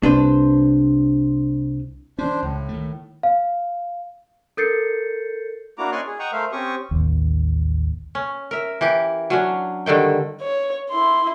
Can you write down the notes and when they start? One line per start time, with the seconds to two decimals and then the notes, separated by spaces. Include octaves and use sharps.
0.03 C2 D4 B4 C5
2.19 E3 C#4 D4 C5
2.42 C#2 A2
2.69 D#3 A3
3.23 F5
4.57 A4 A#4 G6 A6 C7 C#7
5.78 A#3 D4 E4 F#4 A#5 D6
5.92 C#4 D5 D#5 C6 C#6 F#6
6.07 G#4
6.19 D#5 F#5 G5 A#5 C#6 D#6
6.32 A3 A#4 C5 E5 F5
6.52 C4 C#4 G4 C#6 D#6
6.91 A1 D#2
8.15 C#4
8.51 A#4 E5
8.81 E3 G4
9.30 F#3 C#4 D4
9.86 G2 D3 D#3 G5
10.41 C#5
10.90 E4 C6